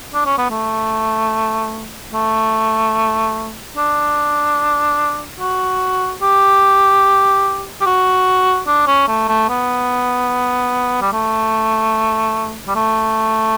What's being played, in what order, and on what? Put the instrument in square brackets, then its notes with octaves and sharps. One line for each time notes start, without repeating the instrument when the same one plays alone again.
[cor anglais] D4
C#4
B3
A3
A3
D4
F#4
G4
G4
F#4
D4
C#4
A3
A3
B3
G3
A3
G3
A3